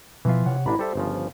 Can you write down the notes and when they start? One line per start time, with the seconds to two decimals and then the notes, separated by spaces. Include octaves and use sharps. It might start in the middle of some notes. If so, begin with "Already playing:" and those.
0.25 B2 E3 F3 F4 E5
0.46 C3 C#5 F#5
0.66 A1 D4 E4 A#5 B5
0.79 G3 A4 C5 E5
0.95 G1 C#3 F3